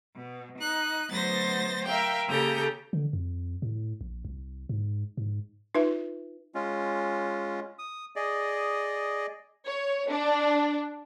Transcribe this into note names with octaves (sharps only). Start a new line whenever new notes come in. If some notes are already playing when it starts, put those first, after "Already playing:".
B2
D#4 F#6
D2 F#3 B3 C5 A6 A#6
A#4 E5 F5 G5
C#3 A#3 G4 A4 A#5 G6
D3
F2
A2
A#1
C2
G#2
G#2
D#4 F4 B4 E5
G#3 C#4 F4
D#6
G#4 D5 D#5
C#5
D4